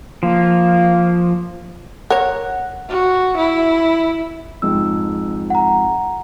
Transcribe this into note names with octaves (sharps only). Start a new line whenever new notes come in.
F3 A#3
A#4 C#5 F#5
F#4
E4
F2 G#2 G#3 E6
F#5 A#5